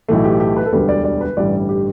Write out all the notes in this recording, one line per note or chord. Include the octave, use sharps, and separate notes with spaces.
B1 A2 E3 A3
G4
G4
B4
A4
E1 D2 D3 G3 B4
D5
D5
B4
A1 G2 D3 G3 D5
G4